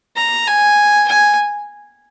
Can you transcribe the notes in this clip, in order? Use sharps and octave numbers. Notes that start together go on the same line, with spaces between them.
A#5
G#5
G#5